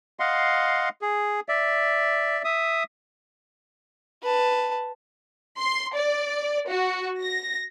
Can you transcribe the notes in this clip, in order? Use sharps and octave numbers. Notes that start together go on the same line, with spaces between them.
D#5 F5 F#5 C6
G#4
D5 E5
E5 D#6
B4 A5
C6
D5
F#4
A#6